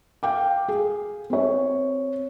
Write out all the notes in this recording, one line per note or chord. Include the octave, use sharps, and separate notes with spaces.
F5 G5 D6
G#4
C4 C#5